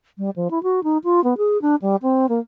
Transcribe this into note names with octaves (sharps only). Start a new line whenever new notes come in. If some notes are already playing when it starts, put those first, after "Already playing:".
G3
F3
E4
F#4
D#4
F4
B3
G#4
D4
G3
C4
A#3